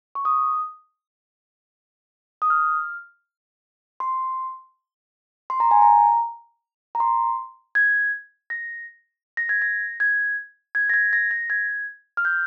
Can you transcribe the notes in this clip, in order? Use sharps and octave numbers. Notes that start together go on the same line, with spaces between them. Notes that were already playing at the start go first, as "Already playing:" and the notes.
C#6
D#6
D#6
F6
C6
C6
A#5
G#5
A#5
A#5
C6
G#6
A#6
A#6
G#6
A#6
G#6
G#6
A#6
G#6
A#6
A#6
G#6
F6
G6